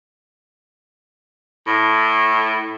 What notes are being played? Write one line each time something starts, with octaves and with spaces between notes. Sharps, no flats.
A2